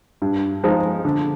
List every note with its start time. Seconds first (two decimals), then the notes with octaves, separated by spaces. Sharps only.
0.22 G2
0.63 F3 G#3 D#4
1.05 D3